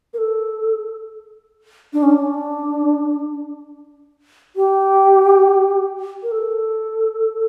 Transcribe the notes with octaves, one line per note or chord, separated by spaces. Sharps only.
A#4
A4
D4
C#4
D4
G4
A#4
A4